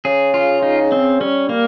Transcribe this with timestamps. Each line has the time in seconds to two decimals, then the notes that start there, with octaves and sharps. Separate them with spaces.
0.05 C#3 G#4
0.34 F4
0.62 D#4
0.92 C4
1.21 G3 C#4
1.49 A#3